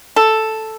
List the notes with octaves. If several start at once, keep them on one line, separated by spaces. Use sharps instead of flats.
A4